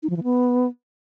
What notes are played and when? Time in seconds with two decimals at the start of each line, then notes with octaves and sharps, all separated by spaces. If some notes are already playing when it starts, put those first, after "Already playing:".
0.03 D#4
0.10 F3
0.17 E3
0.23 B3